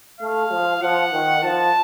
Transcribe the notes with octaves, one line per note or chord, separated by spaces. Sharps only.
A3 F5
F3
F3 F#5
D#3
F3 A5